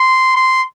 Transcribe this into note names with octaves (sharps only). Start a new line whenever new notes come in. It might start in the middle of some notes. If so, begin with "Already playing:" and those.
Already playing: C6
C6